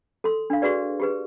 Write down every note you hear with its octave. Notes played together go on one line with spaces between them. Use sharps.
A4 C6
D4 F5
F#4 G#4 B4 D5
G4 G#4 B4